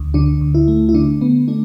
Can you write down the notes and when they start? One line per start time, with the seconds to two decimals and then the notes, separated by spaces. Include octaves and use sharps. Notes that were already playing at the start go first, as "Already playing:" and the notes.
Already playing: D2
0.14 D3 D4
0.41 D2
0.55 E4
0.68 A3
0.89 E4
0.94 D3 D4
1.21 D3 B3
1.48 A3 D4